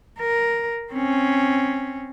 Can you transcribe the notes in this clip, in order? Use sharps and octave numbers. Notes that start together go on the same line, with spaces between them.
A#4
C4 C#4